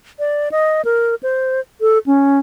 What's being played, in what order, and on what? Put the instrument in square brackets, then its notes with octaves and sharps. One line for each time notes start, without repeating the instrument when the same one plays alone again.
[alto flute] D5
D#5
A#4
C5
A4
C#4